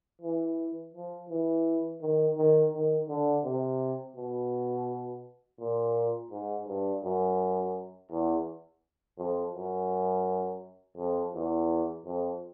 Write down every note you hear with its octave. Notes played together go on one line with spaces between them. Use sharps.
E3
F3
E3
D#3
D#3
D#3
D3
C3
B2
A#2
G#2
G2
F#2
E2
F2
F#2
F2
E2
F2